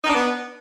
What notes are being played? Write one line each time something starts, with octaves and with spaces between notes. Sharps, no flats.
D#4
D4
B3